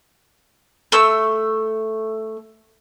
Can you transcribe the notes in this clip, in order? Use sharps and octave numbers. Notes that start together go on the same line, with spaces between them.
A3 E6